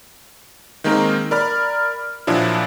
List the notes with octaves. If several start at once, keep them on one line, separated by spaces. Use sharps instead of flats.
D#3 G#3 A#3 C4 D#4 A#4
A#4 D5 B5 F6
A#2 F3 F#3 D4 E4